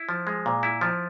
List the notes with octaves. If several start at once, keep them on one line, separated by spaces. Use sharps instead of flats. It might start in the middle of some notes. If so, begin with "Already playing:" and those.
Already playing: E4
F3
G#3
A#2
E4
F3